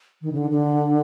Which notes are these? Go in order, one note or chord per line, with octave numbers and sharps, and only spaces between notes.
D#3
C#3
D3
D3